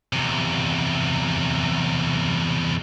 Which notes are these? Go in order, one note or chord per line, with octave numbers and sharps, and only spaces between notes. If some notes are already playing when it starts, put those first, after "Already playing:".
E2 C3